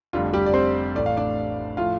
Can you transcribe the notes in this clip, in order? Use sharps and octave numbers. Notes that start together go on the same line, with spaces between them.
F1 F2 D3 G3 F4
G3 G4
D5
C4 C5
A1 A2 A3 D5
F5
D4 D5
A2 F3 A3 F4 F5